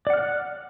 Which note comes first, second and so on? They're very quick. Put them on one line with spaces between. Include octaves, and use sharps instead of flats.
D5 F#5 F6 F#6